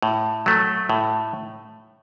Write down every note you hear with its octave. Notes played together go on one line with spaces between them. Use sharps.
A2
F#3 A3
A2